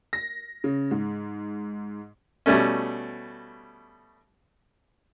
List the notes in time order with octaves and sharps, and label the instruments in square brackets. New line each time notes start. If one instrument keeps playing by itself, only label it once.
[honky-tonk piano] A#6
C#3
G#2
[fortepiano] B2 G3 A3 C#4